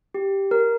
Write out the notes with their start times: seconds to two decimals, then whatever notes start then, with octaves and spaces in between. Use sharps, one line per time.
0.14 G4
0.51 A#4